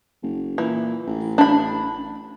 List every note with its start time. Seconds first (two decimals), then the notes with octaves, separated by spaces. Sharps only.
0.23 F#1
0.58 A#2 E3
1.07 A1
1.38 D4 B5